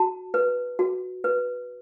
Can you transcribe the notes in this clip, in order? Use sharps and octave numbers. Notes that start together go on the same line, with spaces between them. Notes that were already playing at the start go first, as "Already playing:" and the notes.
Already playing: F#4 A5
B4
F#4
B4